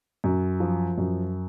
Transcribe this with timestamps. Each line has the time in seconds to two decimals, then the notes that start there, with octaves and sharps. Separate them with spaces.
0.24 F#2
0.60 F3
0.98 F#2